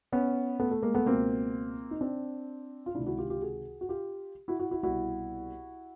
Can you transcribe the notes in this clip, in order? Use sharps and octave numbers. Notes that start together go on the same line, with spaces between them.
B3 C#4
A3 B3
A3
G#3 A#3
A3 B3
C#2 B2 A#3 C4
D#4
C4 D4
F4
C#2 C3 D#3 D4 E4
E4 F#4
F4 G4
F4 G4
F#4 G#4
F#4
F4 G4
E4 F#4
E4 F#4
E4 F#4
C2 B2 E4 F#4